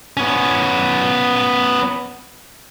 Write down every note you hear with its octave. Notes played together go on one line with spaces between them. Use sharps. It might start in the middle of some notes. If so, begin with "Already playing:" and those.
B3 C#4